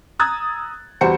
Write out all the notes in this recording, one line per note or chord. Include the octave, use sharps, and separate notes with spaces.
A#5 D#6 E6 F#6 G#6 A6
E2 G3 F#4 C5 C#7